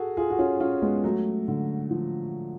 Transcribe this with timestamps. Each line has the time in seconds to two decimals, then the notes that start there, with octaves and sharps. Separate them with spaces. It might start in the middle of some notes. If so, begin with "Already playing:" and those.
Already playing: F#4 G#4 A4
0.17 F4 G#4
0.30 F#4
0.39 C#4 F4
0.60 C#4 F4
0.82 G#3 B3
1.04 F#3 A3
1.48 D3
1.91 F3